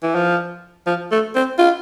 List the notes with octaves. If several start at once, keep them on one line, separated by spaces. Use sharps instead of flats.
E3
F3
F3
A3
C4
F4